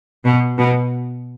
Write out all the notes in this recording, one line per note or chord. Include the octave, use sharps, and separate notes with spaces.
B2
B2